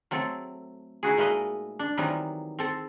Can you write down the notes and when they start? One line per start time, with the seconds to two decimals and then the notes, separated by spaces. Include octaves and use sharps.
0.11 F#3 A3 C4 A4
1.03 D#4 E4 F#4 G#4
1.17 A#2 G#3 A3 B4 D#5 A#5
1.79 D4
1.97 D#3 E3 F#3 G3 B3 C4
2.59 C4 A4